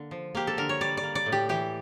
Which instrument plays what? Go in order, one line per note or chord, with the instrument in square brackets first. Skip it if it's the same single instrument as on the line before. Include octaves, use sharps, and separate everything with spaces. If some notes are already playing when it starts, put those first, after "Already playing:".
Already playing: [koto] D3 A#3
F3
A#3 G4
A4
D3 A#4
C#5
G3 D5
D5
A#3
D5
A2
G4
E3 G4